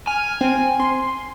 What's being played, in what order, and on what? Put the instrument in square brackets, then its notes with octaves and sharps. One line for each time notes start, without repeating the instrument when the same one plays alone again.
[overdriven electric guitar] G#5 [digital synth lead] F6
[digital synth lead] C4
C6